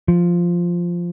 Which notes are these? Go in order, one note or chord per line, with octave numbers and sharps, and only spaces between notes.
F3